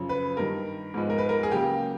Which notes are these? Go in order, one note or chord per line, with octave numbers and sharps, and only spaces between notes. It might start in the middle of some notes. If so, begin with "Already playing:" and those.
Already playing: F#2 C#3 F3
B4
G2 D#3 G3 A#4
G#2 F3 G#3 B3
A#4
B4
A#4
G#4
C#3 F#3 A#3 G4